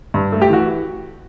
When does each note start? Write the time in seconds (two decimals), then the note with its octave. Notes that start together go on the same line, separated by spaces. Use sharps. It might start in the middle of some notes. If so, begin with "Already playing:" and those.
0.14 G2
0.32 A3
0.42 G4
0.50 E3 F#4